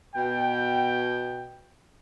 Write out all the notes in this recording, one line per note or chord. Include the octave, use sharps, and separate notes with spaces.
B2 G5